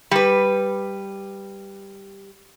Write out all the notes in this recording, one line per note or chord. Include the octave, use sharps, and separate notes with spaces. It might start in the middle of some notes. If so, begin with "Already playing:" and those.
G3 B4